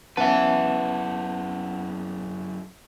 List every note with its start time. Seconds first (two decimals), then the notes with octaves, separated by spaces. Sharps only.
0.17 F#2 B3 C#4 E4 B4 E5 F#5 A5